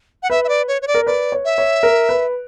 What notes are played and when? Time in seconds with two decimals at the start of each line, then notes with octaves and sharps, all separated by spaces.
0.23 F#5
0.30 B4 E5
0.44 E5
0.49 D5
0.68 C#5
0.82 C#5
0.87 D5
0.94 A#4
1.06 B4 D5
1.32 C#5
1.45 E5
1.58 C#5
1.83 A#4
2.09 B4